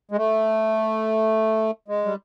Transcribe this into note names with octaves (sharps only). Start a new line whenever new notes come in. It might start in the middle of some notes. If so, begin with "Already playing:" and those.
G#3
A3
G#3
G3